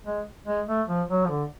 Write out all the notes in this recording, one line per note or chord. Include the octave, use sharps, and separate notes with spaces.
G#3
G#3
A3
F3
F#3
F3
D3